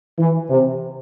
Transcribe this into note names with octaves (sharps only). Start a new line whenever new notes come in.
E3
C3